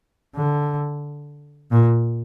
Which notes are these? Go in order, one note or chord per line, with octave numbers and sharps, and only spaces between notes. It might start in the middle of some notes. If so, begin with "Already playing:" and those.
D3
A#2